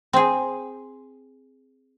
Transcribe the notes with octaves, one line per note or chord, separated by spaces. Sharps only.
C4 G#4